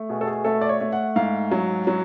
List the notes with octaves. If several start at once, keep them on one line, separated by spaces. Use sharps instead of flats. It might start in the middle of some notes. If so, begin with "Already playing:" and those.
Already playing: A3
B2 G#4
A4
G#4
A3 A4
D5
C#5
A3
F#5
G#2 F5
F#3
F#3